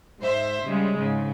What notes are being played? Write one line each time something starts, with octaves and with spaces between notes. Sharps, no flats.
G#2 C5 E5
C#3 G3 G#3
G#2 C#3